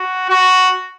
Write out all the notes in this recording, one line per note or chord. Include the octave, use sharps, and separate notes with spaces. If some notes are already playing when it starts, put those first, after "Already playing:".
Already playing: F#4
F#4